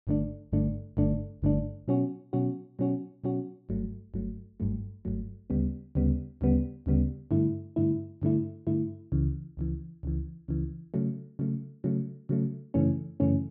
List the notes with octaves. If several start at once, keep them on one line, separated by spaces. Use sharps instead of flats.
G1 G2 D3 A3 D4
G1 G2 D3 A3 D4
G1 G2 D3 A3 D4
G1 G2 D3 A3 D4
B2 F#3 C#4 F#4
B2 F#3 C#4 F#4
B2 F#3 C#4 F#4
B2 F#3 C#4 F#4
G1 G2 F#3 A3
G1 G2 F#3 A3
G1 G2 F#3 A3
G1 G2 F#3 A3
D2 C#3 G3 B3
D2 C#3 G3 B3
D2 C#3 G3 B3
D2 C#3 G3 B3
G2 D3 A3 E4
G2 D3 A3 E4
G2 D3 A3 E4
G2 D3 A3 E4
C#2 C#3 E3
C#2 C#3 E3
C#2 C#3 E3
C#2 C#3 E3
C#3 F#3 A3
C#3 F#3 A3
C#3 F#3 A3
C#3 F#3 A3
F#2 C#3 E3 A3 C#4
F#2 C#3 E3 A3 C#4